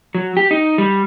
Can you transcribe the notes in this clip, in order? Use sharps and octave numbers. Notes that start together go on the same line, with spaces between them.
F#3
G4
D#4
G3